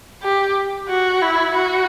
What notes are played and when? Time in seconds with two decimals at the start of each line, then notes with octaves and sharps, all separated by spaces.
0.22 G4
0.89 F#4
1.21 E4
1.55 F#4